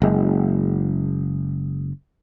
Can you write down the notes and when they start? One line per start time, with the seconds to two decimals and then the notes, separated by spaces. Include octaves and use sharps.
0.02 F#1 G#3